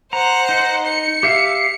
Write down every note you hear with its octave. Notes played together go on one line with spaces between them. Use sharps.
C5 F#5 A#5
D#4
C#7
G4 E5 F5